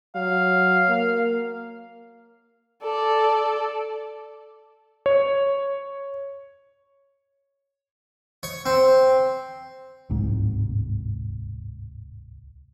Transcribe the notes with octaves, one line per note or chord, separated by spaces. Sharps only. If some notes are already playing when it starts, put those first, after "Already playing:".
F#3 F5
A#3
A4 D5
C#5
C#5
C4
D1 G1 C2 G#2